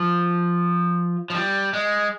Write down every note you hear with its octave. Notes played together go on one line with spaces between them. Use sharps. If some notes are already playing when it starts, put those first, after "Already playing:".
Already playing: F3
F3
G3
G#3